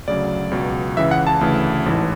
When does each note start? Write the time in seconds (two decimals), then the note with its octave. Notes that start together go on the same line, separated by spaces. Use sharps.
0.07 D2 C#3 F#3 D5
0.51 C#2 B2 F#3
0.97 C#2 C#3 E3 E5
1.11 F#5
1.27 A5
1.41 D2 C#3 E3
1.86 A1 G#2 E3